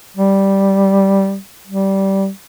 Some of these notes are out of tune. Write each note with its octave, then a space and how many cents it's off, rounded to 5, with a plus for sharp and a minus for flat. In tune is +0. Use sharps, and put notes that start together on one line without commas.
G3 -5
G3 -15